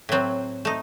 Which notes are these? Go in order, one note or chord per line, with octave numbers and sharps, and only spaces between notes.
A2 F#3 C4
A3 D#4